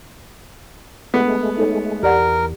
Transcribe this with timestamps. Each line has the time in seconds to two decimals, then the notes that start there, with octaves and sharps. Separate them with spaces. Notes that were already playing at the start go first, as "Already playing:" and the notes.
1.14 G#3 A3 B3
1.58 D#4 A4 C#5
2.03 E2 G4 A#4 D5 F#5